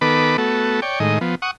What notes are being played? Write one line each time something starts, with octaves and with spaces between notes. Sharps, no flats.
D#3 B3 A4 B4 B5 D6
A3 B3 F#4 A4
C#5 D5 G5
A2 D#3 G#3 D#5
F3 B3
F#5 C#6 D#6